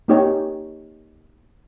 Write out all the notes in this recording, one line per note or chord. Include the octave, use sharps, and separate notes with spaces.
A#3 D#4 G4 C#5 G5